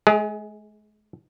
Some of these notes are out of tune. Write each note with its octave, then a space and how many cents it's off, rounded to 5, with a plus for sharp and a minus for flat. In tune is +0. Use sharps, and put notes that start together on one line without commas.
G#3 +40 G#4 +0